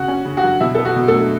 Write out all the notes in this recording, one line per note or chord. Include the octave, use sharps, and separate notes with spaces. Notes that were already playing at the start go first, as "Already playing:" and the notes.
Already playing: C#3 F#4 F#5
C#4
C#3
F#4 F#5
F#3
B2 E4 E5
B3 A4
F#4
B2
A3 A4
F#3